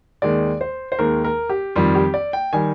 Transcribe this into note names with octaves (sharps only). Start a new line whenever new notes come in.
D#2 D#3 G#3 D5
C5
C5
D#2 D#3 G#3 A#4
A#4
G4
F2 D#3 G3 F4
G4
D5
G5
D#3 G3 G#5